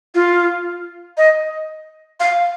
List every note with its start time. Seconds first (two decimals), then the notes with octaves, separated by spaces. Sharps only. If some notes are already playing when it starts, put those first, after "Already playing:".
0.14 F4
1.17 D#5
2.20 F5